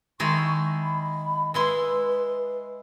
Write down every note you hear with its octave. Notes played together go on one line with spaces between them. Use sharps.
D#3 G#3 E4 C#6
B5
G#3 E4 B4 C6